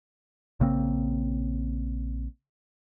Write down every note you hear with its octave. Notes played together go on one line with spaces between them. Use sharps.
A#1 C#3 A#3 C4